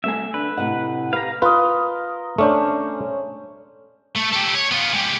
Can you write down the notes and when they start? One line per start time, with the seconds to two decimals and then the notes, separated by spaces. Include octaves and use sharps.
0.04 C2 A3 E5 G#5
0.34 D3 B4
0.57 A2 C3 D#5 F#5
1.13 G4 B4 F5 A#5
1.42 F4 A#4 B4 D#5
2.38 A3 C#4 D4 C5
4.15 A3
4.32 G4 A4
4.55 C#5
4.72 B3 F4
4.94 G#3 G4